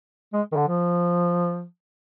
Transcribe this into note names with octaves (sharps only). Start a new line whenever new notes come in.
G#3
D#3
D3
F3